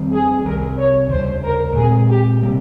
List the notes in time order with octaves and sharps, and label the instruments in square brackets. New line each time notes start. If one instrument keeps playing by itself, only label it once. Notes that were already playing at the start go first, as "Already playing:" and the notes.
Already playing: [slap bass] F2 D#3 G3 C4
[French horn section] G#4
[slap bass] C2 C3 G3 [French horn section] A#4
[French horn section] C#5
[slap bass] D#2 C#3 G3 [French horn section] C5
[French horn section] A#4
[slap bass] A#2 G#3 C4 [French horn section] G#4
[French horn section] G4
[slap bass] C3 G3 A#3